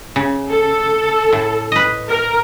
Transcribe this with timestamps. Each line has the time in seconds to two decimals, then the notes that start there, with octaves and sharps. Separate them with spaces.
0.16 C#3
0.49 A4
1.32 A2
1.72 B4 D#5
2.08 A#4